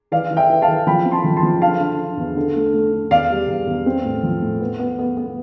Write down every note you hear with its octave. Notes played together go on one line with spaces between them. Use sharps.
E3 D5 F5
E3
E5 G5
E3
F5 A5
E3
F3 G5 B5
C4
A5 C6
F3
A5 C6
F3
D3 F5 A5
D3
D3
E2
D3
A3
A3
D3
E2 D5 F5
G3
E2
E2
C4
A2
F3
A2
B3
B3
B3
B3